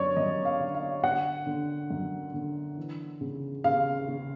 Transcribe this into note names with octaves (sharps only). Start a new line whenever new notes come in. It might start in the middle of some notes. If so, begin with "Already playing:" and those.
Already playing: F#2 D3 C#5 D5
F#2 D#5
F5
D3
F5
D3 F#5
D3
F#2
D3
E3
C#3
C#3 F5
C#3